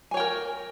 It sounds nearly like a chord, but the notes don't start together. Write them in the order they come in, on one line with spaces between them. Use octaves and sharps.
G#5 C#5 G5 A#4